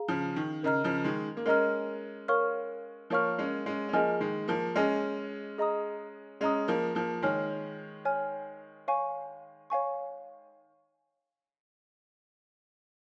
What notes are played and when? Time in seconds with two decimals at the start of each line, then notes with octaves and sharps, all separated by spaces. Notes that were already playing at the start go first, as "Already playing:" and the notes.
Already playing: G#4 F5 A#5
0.08 C#3 F3
0.36 D#3
0.63 C#3 A#4 D#5 A#5 F6
0.84 C#3 F3
1.04 D#3 G#3
1.37 A#3
1.45 G#3 C#4 A#4 D#5 A#5 F6
2.28 A#4 C#5 F5 C#6 F6
3.10 F3 A#3 A#4 C#5 F5 C#6 F6
3.38 G#3 C#4
3.66 G#3 C#4
3.89 C#4
3.93 F3 A#3 G#4 D#5 G#5 F6
4.21 D#3 G#3
4.48 F3 A#3
4.75 G#3 C#4 G#4 D#5 G#5 F6
5.58 G#4 D#5 A#5 D#6
6.41 G#3 C#4 G#4 D#5 A#5 D#6
6.68 F3 A#3
6.95 F3 A#3
7.22 D#3 G#3 C#5 G#5 F6
8.05 C#5 G#5 F6
8.88 C#5 F5 G#5 C#6
9.70 C#5 F5 G#5 C#6